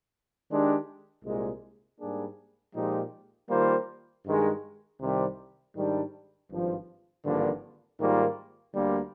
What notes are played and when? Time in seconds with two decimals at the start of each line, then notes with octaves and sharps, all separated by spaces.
0.50 D#3 G#3 D4 G4
1.24 C2 A#2 G#3
2.00 G#2 G3 A#3 D4 G#4
2.74 A#2 F3 G#3 D#4 G4
3.50 D#3 G3 A#3 F4 C5
4.25 G2 D#3 G#3
5.00 C2 C3 D#3 G3 C4
5.75 G#2 D#3 G3 D4 G4
6.50 G#1 G2 F3
7.25 G#1 G2 D3 F3 A#3
7.99 G#2 D#3 G3 A#3 F4
8.75 D2 D3 G3 A#3